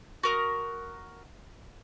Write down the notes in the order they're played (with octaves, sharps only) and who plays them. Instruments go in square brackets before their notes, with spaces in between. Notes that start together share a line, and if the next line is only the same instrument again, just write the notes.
[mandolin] F#4 A#4 D#6